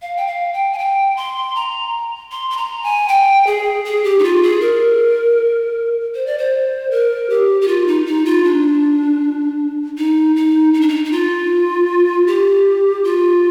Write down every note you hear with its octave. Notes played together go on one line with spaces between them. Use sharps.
F5
G5
F5
G5
G#5
G5
C6
A#5
C6
C6
A#5
G#5
G5
G#4
G#4
G4
D#4
F4
G#4
A#4
C5
D5
C5
A#4
G4
G4
F4
D#4
D#4
F4
D4
D#4
D#4
D#4
D4
D#4
D#4
F4
G4
F4